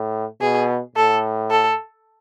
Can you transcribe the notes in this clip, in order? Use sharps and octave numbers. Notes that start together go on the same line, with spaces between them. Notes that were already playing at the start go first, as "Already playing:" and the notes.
Already playing: A2
B2 G#4
A2 A4
A4